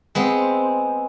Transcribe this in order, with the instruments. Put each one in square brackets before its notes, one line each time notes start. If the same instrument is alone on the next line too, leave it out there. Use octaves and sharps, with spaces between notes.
[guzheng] G#3 B3 C4